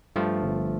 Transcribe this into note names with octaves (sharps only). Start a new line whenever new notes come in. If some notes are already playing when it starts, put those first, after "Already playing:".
G2 F3 A3
G1